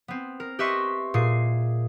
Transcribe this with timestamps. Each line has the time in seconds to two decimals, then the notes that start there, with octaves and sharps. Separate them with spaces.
0.08 B3 C4
0.40 A#4
0.59 G4 B4 D#5 E5 C6 C#6
1.14 A#2 G#4 C7